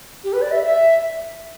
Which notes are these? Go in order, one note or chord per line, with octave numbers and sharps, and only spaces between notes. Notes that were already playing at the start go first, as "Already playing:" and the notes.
G4
B4
D5
E5
E5